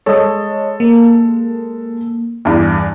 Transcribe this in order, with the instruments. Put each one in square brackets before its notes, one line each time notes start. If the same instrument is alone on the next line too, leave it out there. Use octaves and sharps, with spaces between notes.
[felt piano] G#3 A4 [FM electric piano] C#5 D#5
[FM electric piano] A#3
[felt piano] E2 G2